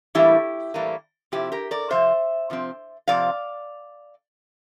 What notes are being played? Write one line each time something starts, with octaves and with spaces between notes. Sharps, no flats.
A2 E3 G3 A#3 E4 G4
A2 E3 G3 A#3
C3 F3 C4 E4 G4
G4 A#4
A#4 D5
C3 F3 C4 C5 E5
C3 F3 C4
C3 F3 C4 D5 F5